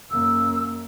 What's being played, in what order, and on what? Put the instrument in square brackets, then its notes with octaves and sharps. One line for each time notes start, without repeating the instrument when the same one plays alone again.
[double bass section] F#2 C#3 A#3 [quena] E6